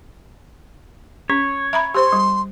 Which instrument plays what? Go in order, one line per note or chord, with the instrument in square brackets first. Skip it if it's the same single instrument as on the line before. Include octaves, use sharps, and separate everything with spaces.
[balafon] C#4 [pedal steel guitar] C#5
[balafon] E5 A#5 B5
[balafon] G4 C5 [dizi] C6
[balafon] G3